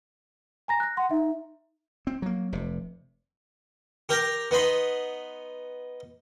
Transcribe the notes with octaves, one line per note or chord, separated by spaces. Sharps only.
G#5 A#5 A#6
F#6 A#6
F#5 C6
D#4 E5
C4
F#3 A#3
F1 C3
G4 A#4 G5 A#5
B3 D#4 B5 C6